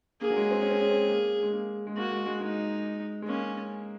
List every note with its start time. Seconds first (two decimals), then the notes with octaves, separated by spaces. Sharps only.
0.21 A#3 G#4
0.30 F#3
0.37 G#3
0.51 C4
0.61 C#4
0.71 C4
0.81 C#4
0.90 C4
1.09 A#3
1.43 G#3
1.53 A#3
1.87 G#3
1.97 A#3 F#4
2.12 G#3
2.26 G#3
2.41 G#3 D#4
3.22 G#3
3.28 A#3 C#4